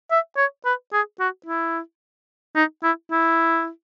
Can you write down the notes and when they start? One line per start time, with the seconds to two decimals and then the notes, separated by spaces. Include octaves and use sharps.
0.11 E5
0.37 C#5
0.65 B4
0.93 G#4
1.20 F#4
1.46 E4
2.56 D#4
2.83 E4
3.11 E4